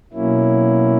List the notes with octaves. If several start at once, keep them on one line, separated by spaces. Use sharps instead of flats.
B2 F#3 A#3 C#4 E4